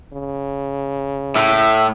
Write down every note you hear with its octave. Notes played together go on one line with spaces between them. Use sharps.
C#3
A2 E5